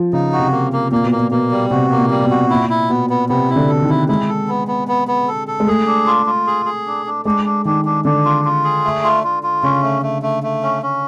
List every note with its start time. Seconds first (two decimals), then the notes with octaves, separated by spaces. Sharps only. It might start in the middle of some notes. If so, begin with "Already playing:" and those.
Already playing: F3
0.13 C#3 D#4
0.33 F#4
0.39 C3
0.52 A#3
0.73 A#3
0.92 A#2 A#3
1.04 B2
1.12 A#3
1.17 A#2
1.31 B2 A#3
1.51 G3
1.71 C3 F#4
1.91 A#3
1.97 A#2
2.11 G3
2.24 B2
2.31 F#4
2.50 A#2 E4
2.70 E4
2.89 B2 B3
3.10 B3
3.29 C3 B3
3.49 E4
3.56 D3
3.69 A4
3.82 D#3
3.89 E4
4.08 G#3 E4
4.29 A4
4.48 B3
4.68 B3
4.88 B3
5.08 B3
5.28 A4
5.48 A4
5.60 G#3
5.67 A3 G#4
5.86 D4
6.07 F4
6.26 F4
6.47 G#4
6.66 G#4
6.87 D4
7.06 D4
7.25 G#3 D4
7.45 D4
7.65 D#3 D4
7.85 D4
8.05 D3 D4
8.25 F4
8.45 F4
8.64 G#4
8.85 A3
9.04 F4
9.24 F4
9.43 F4
9.63 C#3 C#4
9.82 A3
10.02 A3
10.22 A3
10.43 A3
10.63 C#4
10.82 C#4